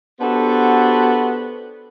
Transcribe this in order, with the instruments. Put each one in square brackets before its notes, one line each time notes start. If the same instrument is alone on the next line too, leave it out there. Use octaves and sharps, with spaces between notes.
[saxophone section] B3 D4 F#4 G4 A4 C5